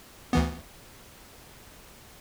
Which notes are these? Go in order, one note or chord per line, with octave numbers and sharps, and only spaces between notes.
D2 E3 B3